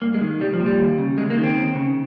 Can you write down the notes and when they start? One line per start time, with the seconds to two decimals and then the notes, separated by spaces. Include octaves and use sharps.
0.02 G2 A#3
0.14 G#3
0.21 D#3
0.40 C2 G3
0.54 F3
0.60 A#2
0.66 G3
0.79 D#2
0.98 C#3
1.17 D#2 G#3
1.30 A#3
1.37 D#3
1.44 C4
1.56 D#2
1.75 C#3